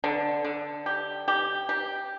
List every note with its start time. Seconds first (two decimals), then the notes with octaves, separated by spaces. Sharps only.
0.04 D3
0.45 D3
0.86 G4
1.28 G4
1.69 G4